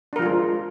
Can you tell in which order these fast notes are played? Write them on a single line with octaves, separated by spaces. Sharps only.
D4 A#4 F3 F4 G#3